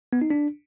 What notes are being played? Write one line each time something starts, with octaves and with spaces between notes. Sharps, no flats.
B3
D#4
D4